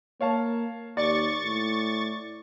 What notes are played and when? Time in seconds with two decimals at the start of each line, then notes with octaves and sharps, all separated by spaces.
0.21 A#3 C#5 F5 A5
0.97 D#2 D5 C#6 A6
1.44 A2